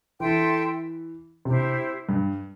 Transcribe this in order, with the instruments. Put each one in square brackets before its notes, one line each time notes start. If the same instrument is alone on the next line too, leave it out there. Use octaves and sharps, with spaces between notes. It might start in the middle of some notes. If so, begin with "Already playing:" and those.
[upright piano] E3 [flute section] A4 E5 G5 C6
[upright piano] C3 [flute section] E4 G4 C5
[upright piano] G2